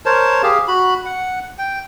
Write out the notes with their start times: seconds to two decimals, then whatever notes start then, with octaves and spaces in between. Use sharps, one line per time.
0.06 A#4 C5 C#5 A5
0.43 G4 G#4 F5
0.68 F#4 B5
1.05 F#5
1.58 G5